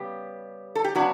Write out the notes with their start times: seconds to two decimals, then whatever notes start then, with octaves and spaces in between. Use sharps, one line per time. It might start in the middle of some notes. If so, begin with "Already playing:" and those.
Already playing: C#3 G3 B3 G4
0.75 A4
0.84 G4
0.95 C#3 F#3 B3 D4 F#4